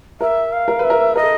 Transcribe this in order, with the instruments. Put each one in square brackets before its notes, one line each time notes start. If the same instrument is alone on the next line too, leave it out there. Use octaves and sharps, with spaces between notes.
[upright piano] A#4 [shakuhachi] E5
[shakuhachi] F5
[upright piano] A#4
[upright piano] B4 [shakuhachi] E5
[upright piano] A#4
[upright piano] A#4 [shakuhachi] D#5
[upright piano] A4